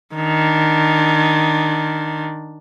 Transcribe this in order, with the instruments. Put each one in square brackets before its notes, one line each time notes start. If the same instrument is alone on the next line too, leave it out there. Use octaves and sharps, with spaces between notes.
[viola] D#3 D4